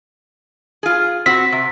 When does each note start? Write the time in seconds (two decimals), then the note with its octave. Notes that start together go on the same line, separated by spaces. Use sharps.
0.83 F4 G#4
1.26 C4 F#4 B6
1.52 C3